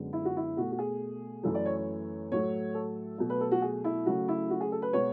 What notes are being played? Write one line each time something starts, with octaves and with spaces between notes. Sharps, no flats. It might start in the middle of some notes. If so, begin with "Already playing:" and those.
Already playing: F#2 D3 G#3 B3
E4
F#4
E4
B2 A3 F#4
F#4
G#4
F#2 E3 A3 A4
D5
C#5
C#5
A2 F#3 A3 C#5
A4
B2 F#3 A3
B4
A4
F#4
G#4
E4
C#3 F#3 A3 F#4
E4
F#4
G#4
A4
B4
B2 G#3 B3 C#5